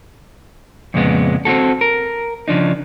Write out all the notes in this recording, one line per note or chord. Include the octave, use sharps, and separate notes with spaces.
F2 A#2 C#3 G#3 B3
C4 D4 F#4 A4
A#4
C#3 F3 D4 D#4